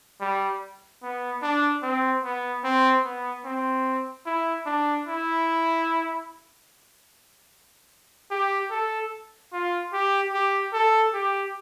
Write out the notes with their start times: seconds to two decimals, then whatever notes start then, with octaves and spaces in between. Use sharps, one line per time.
0.21 G3
1.03 B3
1.42 D4
1.83 C4
2.24 B3
2.64 C4
3.04 B3
3.45 C4
4.26 E4
4.66 D4
5.07 E4
8.31 G4
8.71 A4
9.53 F4
9.93 G4
10.33 G4
10.73 A4
11.14 G4